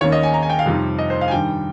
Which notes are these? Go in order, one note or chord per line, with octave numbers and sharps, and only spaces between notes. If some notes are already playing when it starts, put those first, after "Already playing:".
D#2 D#3 A#3 C#4 C#5
D#5
G#5
A#5
G#5
G5
F5
F2 C3 G3 C4 D#4
D#5
C5
F5
G#5
G2 D#3 G3 G5